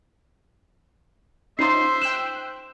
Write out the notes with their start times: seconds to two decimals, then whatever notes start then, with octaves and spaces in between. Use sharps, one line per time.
1.59 C#4 D#4 F4 C5 E5 C6 C7
2.02 G5 E6 F#6 E7